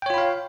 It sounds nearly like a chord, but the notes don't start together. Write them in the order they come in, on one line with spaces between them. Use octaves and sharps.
G5 C#5 F4 B5 F5